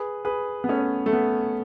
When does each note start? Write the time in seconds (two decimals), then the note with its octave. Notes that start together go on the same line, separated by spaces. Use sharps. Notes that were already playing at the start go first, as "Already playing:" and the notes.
Already playing: G#4 B4
0.25 G#4 B4
0.64 B3
0.68 A3 C#4
1.06 A3
1.13 B3